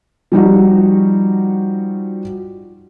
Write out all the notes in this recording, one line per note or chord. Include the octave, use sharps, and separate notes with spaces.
F3 G3 D#4 F#4